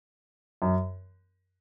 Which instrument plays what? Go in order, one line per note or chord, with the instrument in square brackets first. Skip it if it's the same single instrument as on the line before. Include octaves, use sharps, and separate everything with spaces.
[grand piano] F#2